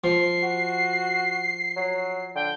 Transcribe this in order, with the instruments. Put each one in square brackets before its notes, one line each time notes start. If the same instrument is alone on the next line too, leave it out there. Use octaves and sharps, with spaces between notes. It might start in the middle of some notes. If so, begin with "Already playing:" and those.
[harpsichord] F3 [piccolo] C7
[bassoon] F#4
F#3
[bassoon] D3 [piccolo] G5